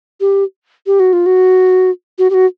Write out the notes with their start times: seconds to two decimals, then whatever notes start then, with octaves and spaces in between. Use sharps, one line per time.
0.21 G4
0.87 G4
1.00 F#4
1.13 F4
1.26 F#4
2.18 F#4
2.30 G4
2.34 F#4